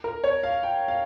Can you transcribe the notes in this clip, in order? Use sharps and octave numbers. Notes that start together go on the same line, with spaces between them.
A#4
C#5
F5
G5
F5